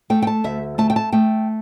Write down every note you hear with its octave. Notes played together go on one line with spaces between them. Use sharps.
A3 G5
G5
A5
D2 E5
A3 A5
G5
A5
A3 G5